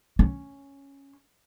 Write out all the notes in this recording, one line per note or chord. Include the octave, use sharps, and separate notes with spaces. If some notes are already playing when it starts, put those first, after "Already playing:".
C#4